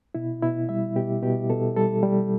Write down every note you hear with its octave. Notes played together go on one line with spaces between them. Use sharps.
B2 E4
B2 E4
G3 E5
B2 G4
B2 G4
B2 A4
G3 A4
G3